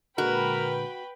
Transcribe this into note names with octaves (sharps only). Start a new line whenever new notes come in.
A#2 D3 G#3 F#4 A#4 B4 G5 B5